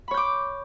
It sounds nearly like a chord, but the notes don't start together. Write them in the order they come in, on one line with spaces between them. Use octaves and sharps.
B5 C#5 G6 D6